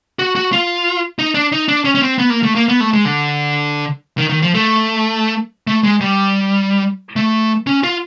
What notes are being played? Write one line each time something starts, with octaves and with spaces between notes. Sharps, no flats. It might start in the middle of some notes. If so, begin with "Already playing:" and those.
F#4
F#4
F4
D#4
D4
D#4
D4
C#4
C#4
C4
B3
A#3
A3
A#3
B3
A3
G#3
D3
D#3
D#3
F3
A3
A3
G#3
G3
A3
C#4
F4